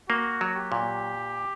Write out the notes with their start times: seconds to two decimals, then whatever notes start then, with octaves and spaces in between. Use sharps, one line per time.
0.09 A#3 F#4
0.41 F#3
0.56 G4
0.72 A#2